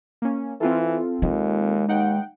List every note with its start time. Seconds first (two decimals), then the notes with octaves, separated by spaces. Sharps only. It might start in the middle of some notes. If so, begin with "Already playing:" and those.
0.22 A#3 C#4
0.61 E3 C4 F4 A4
1.22 D#2 G#3
1.88 D#2 D#4 F#5 G5